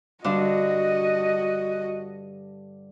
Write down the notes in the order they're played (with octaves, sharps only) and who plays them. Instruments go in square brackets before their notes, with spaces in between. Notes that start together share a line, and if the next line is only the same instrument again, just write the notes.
[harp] G2 D3 D4 [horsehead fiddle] F#4 D#5